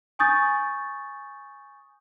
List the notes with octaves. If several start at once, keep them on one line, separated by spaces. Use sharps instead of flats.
G#5 C#6 D#6 G6 A6